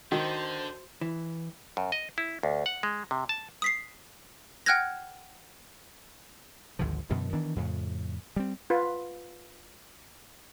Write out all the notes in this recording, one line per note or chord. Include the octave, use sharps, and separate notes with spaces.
D3 D#3 F#4 C5
E3
F#2
D#5
E4
D2
F#5
G#3
C3
A5
D#6 B6 C7
F#5 G5 F6 F#6 G#6 A#6
G#1 D2 D3 F3
F#2 B2 D3 E3
D#3 E3 B3 D4
F2 A2 C#3
G3 C4
F4 B4